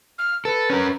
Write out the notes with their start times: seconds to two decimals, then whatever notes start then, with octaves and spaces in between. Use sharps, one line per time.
0.18 F6
0.45 A4 B4
0.70 C#4 A#4